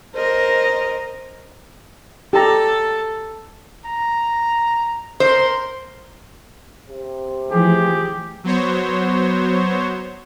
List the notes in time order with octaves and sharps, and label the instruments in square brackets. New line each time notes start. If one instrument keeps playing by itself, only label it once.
[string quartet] A#4 C5 D#5
[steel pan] G4 A#5 [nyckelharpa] A4
[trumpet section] A#5
[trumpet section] A#4 C6 [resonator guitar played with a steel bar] C5
[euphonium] C3
[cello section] E3 F3 A3 [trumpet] G4 [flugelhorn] G#4
[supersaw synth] F#3 B3 C5 C#5